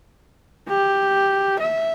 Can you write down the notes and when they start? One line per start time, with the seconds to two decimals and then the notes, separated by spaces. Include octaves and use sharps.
0.69 G4
1.60 E5